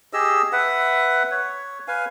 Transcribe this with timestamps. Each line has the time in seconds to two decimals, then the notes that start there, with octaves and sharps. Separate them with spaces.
0.13 G4 G#4 D#5 E6
0.52 B4 E5 F#5
1.31 C#5
1.88 B4 F5 G#5